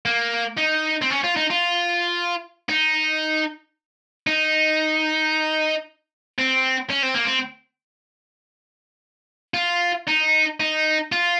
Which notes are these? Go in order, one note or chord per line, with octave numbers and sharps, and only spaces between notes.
A#3
D#4
C4
C#4
F4
D#4
F4
D#4
D#4
C4
C#4
C4
A#3
C4
F4
D#4
D#4
F4